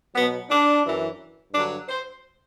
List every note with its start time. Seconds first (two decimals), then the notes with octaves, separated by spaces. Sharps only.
0.15 B2 F#3 B3
0.50 D4
0.84 F#2 E3
1.53 G2 D3 F#3 D4
1.88 C5